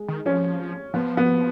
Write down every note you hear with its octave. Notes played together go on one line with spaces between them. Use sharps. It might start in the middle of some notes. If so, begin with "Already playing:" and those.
Already playing: G#3
D#3
F3 C#4
F3 B3
B3